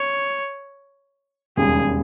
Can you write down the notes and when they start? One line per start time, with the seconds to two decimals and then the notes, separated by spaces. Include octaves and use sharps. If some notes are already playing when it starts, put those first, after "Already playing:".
Already playing: C#5
1.57 E1 D#2 C#3 G3 G#4